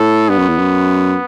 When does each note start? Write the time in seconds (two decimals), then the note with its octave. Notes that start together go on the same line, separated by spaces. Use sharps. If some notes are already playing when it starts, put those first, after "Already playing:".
Already playing: A2 A4
0.29 G2 B3
0.38 F#2
0.48 E2
0.58 F#2